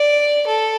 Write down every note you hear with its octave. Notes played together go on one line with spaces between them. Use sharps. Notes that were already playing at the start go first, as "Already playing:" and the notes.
Already playing: D5
A4